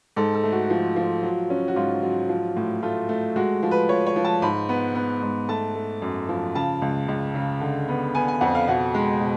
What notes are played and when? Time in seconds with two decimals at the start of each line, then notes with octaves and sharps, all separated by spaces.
0.16 G#2 A4
0.35 A4
0.44 A3
0.52 F#4
0.70 F3
0.96 F3
1.23 F#3
1.50 C#4
1.68 F#4
1.76 G#2 F4
2.03 F#3
2.29 F3
2.56 A2
2.82 A3 F4
3.09 A3
3.36 G#3 F#4
3.63 F3
3.71 B4
3.89 F3 C#5
4.07 C#5
4.16 F3
4.24 A5
4.42 G#2 B5
4.69 B3
4.95 B3
5.22 G#2
5.49 A3 A5
5.75 A3
6.02 F#2
6.29 F3
6.55 C#3 A5
6.82 C#2
7.08 C#2
7.35 C#3
7.61 D3
7.88 B3
8.15 B3 G#5
8.28 G#5
8.41 F2 F#5
8.55 F5
8.68 B2 F#5
8.94 G#3
9.21 B2